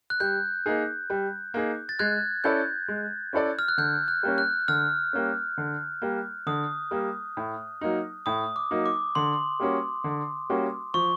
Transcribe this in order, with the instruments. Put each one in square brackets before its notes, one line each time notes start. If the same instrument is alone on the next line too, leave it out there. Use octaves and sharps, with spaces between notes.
[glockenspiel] F#6
[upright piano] G3 [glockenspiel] G6
[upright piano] A#3 D#4 G#4
G3
A#3 D#4 G#4
[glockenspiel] A6
[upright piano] G#3 [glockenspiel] F#6 G#6
[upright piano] C#4 E4 A4 D5 [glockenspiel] G6
[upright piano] G#3
C#4 E4 A4 D5
[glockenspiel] F6
F#6
[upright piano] D3 [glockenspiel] G6
[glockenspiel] F#6
[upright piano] G3 A#3 C#4
[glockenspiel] F#6
[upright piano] D3 [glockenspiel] F6
[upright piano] G3 A#3 C#4
D3
G3 A#3
[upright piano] D3 [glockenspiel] D#6
[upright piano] G3 A#3
A2
F#3 A#3 D#4
[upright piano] A2 [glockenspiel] D#6
[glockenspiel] D6
[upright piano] F#3 A#3 D#4
[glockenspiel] D6
[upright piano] D3 [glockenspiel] C6
[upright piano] G3 A#3 C#4 F#4
D3
G3 A#3 C#4 F#4
[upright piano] F3 [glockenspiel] C#6